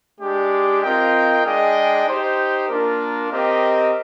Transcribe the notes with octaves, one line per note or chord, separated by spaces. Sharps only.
G#3 D4 G4
C4 F4 A#4 D#5 G5
G#3 D4 G#4 D#5 G5
D#4 G4 C5
A#3 D4 F4 A#4
C4 G4 A#4 D#5